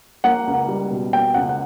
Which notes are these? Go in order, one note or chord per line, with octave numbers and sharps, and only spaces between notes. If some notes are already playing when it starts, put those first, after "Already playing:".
A#3 F#5
C#2
G3
B2
A#3 G5
C#2 F#5
F#5